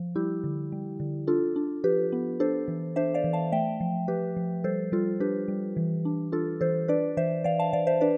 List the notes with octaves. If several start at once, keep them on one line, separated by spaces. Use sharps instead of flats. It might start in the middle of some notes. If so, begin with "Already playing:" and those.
Already playing: F3
G3 E4 G4
D3
G3
D3
D4 F4 A4
D4
F3 G4 B4
B3
D4 A4 C5
E3
D4 C5 E5
D5 F5
E3
F5 A5
A3 E5 G5
F3
F3 G4 B4
F3
G3 A4 C5
G3 F4 A4
D4 G4 B4
G3
E3
D4
D4 F4 A4
E3 A4 C5
D4 B4 D5
E3 C5 E5
E3 D5 F5
F5 A5
E3 D5 F5
C5 E5
D4 B4 D5